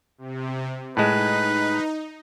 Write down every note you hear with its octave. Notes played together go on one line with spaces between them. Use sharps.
C3
A2 G#3 D#4 B4